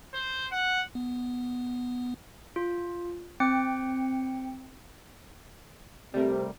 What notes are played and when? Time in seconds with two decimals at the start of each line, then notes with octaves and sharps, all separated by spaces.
0.14 C5
0.52 F#5
0.95 B3
2.56 F4
3.40 C4 G5 C#7
6.14 C3 G3 A3 A#4